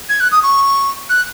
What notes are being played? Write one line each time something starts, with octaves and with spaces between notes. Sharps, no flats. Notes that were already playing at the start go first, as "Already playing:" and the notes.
G#6
F#6
D#6
C#6
F#6